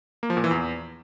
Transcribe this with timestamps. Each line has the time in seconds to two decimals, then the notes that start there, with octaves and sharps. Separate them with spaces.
0.23 A#3
0.30 F3
0.37 A#2
0.44 E3
0.51 E2